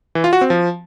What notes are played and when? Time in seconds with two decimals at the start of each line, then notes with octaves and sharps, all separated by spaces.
0.15 E3
0.24 F4
0.33 F#4
0.41 C4
0.50 F3